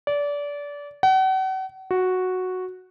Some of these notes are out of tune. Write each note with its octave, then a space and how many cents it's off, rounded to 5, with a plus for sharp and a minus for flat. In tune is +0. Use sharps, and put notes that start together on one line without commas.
D5 -25
F#5 +40
F#4 -5